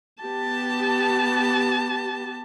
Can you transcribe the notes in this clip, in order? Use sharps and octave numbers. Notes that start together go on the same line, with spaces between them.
B3 G4 A5